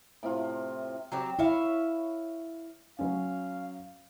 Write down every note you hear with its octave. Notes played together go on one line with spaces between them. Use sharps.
A2 C3 F4
F#3 C4 G4
E4 C#5 E5 F5
F#3 C#4 F5